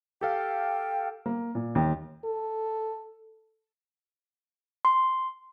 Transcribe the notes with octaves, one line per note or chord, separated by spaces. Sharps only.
G4 A4 F5 G5
A#3
A#2
D#2
A4
C6